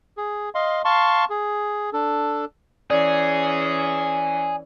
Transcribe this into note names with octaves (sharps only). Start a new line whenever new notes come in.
G#4
D#5 F5 C6
F5 A5 C6 C#6
G#4
D4 A4
E3 C#4 G#4 D5